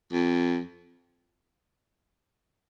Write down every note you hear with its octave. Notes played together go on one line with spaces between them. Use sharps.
F2